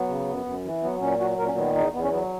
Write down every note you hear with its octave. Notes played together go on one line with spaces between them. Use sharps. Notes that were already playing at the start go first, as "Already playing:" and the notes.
Already playing: F#3 B3
C#3
F#2
F#2
E3
F#3 B3
A#2 C#4
F#3 F#4
A#2 A#4
C#4
D#3 B3
E2 D#4
E2 B3
C#4
F#3 B3